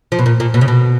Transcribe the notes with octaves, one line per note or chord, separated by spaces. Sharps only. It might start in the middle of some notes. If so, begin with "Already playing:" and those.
F3
B2
A#2
A#2
B2
C#3
B2